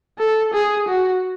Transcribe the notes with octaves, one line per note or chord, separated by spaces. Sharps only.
A4
G#4
F#4